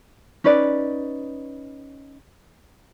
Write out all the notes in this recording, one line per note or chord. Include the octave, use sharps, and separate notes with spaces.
C#4 D#4 B4 D5